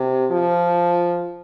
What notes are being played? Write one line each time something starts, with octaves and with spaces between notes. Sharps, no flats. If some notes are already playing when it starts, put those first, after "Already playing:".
Already playing: C3
F3